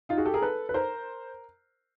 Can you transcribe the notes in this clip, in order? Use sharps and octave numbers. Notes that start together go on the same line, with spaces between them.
D#4 F4
F#4 G#4
G4 A4
G#4 A#4
A4 B4
B4
A#4 C5